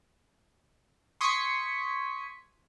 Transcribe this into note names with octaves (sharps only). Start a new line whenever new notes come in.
C6 C#6 D#6 G#6 B6 C#7